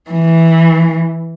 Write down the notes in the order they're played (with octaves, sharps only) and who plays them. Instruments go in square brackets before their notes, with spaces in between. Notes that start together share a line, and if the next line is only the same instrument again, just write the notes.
[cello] E3